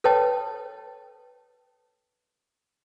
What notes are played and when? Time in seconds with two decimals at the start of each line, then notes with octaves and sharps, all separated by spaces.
0.04 A4 B4 C#5 D#5 G5 A5